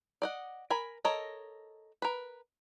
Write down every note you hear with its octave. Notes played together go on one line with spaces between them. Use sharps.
D5 D#5 F#5
A#4 G#5 B5
A4 A#4 C#5 D#5
A#4 B4